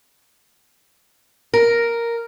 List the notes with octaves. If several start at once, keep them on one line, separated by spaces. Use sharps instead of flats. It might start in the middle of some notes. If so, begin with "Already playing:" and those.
A#4